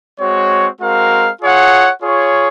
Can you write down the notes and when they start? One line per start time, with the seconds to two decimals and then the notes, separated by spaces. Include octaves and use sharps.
0.19 G#3 C4 F#4 C#5
0.81 G#3 C4 F#4 A#4 F5
1.42 F4 G#4 C#5 F#5
2.02 F4 G#4 C#5